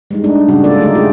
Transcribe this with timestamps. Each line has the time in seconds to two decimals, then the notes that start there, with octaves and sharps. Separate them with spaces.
0.11 G3 G#3 D#4
0.24 A3 D4 D#4
0.48 C#3 G3 C#4 F#4
0.64 G#3 A#3 F4 A4 D5
0.79 D3 A3 D#4 D5
0.95 A3 F4 G4 G#4